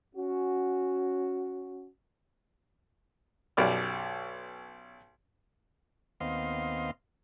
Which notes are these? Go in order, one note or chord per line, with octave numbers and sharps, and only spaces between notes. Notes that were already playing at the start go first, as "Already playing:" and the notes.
C#4 F#4
B1 F#2 G4 D5 B5 F6
D#2 B3 C4 D#5 F5 C6